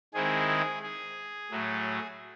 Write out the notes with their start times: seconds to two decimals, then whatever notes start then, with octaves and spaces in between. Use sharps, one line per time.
0.14 D#3 G#3 C4 E4 G#4
0.47 G#4
0.83 G#4
1.51 A2 F#3 A3